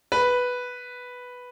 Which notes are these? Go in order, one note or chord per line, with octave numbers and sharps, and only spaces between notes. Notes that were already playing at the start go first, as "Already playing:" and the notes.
B4